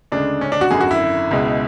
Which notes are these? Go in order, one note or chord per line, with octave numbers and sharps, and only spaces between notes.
D2 C#3 G#3 D4
C#4
D4
F#4
G#1 F#2 D3 G#4
F#4
E4
C#2 B2 G#3